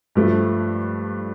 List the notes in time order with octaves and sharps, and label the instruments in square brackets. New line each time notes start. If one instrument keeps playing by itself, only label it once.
[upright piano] G2 F3 A3